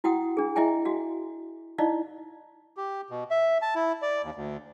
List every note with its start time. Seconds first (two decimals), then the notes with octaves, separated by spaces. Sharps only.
0.04 E4 F#4 F#5 G5 D#6
0.37 D4 G#4
0.56 E4 D#5 E5 G5 G#5
0.85 F#4 F5
1.78 D#4 E4 D5 D#5 F5
2.76 G4
3.10 B2
3.31 E5
3.62 A5
3.75 E4
4.02 D5
4.23 D#2
4.35 D2